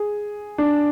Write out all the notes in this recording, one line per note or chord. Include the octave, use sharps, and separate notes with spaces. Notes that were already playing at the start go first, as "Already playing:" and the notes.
Already playing: G#4
D4